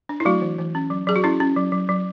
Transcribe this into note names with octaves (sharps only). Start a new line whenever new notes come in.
D4
E4
F#3 A3 F#4
E3
E3
C#4
F#3
F#3 G#4
F#4
C#4 E4
C#4
F#3
F#3
F#3